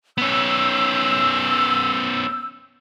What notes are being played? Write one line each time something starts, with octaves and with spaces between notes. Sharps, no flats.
B3 C#4 E6 G6